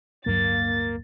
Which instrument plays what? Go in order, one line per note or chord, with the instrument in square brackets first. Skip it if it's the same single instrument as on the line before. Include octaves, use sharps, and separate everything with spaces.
[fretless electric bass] D1 G2 F#3 [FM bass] A#3 [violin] A6